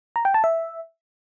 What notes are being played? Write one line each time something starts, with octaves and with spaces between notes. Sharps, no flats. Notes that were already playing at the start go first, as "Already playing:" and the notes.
A#5
G5
A5
E5